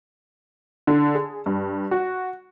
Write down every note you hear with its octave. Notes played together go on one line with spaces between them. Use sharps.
D3
G#4
G2
F#4